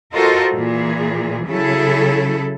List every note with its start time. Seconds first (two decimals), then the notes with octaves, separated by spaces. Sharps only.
0.14 F4 F#4 A4 A#4 C5 D#5
0.53 A#2 E3 G#4
1.46 C#3 F#3 E4 G#4 A4